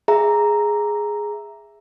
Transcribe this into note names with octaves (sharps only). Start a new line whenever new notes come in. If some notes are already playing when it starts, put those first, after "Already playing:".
G#4 E5 A#5